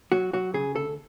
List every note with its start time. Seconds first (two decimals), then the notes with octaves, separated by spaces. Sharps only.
0.12 F#3 F#4
0.33 F#3 F#4
0.54 C#3 G#4
0.75 D2 A4